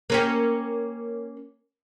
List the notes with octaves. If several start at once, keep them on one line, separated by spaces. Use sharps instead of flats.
A#3 C#4 G4